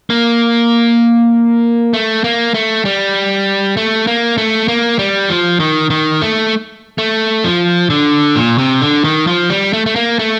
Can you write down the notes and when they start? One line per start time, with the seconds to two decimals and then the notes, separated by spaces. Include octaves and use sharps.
0.10 A#3
1.94 A3
2.24 A#3
2.54 A3
2.85 G3
3.77 A3
4.07 A#3
4.38 A3
4.68 A#3
4.99 G3
5.30 F3
5.60 D#3
5.90 D#3
6.22 A3
6.98 A3
7.44 F3
7.90 D3
8.36 A#2
8.58 C3
8.81 D3
9.04 D#3
9.27 F3
9.50 G3
9.73 A3
9.86 A3
9.96 A#3
10.19 A3